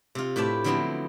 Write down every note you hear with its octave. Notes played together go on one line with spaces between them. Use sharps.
C3 F4
A2 G4 B4 D5 A5
D3 F3 F#3 B3 C4 E4